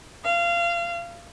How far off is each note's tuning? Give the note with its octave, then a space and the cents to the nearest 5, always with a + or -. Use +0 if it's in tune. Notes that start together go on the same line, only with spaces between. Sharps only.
F5 -25